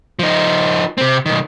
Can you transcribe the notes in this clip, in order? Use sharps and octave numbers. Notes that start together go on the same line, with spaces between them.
F3 D#4
C3 C4
B1 D#3